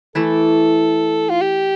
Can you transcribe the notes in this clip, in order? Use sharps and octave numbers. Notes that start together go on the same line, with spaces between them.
E3 A3 E4 A4
F4
G4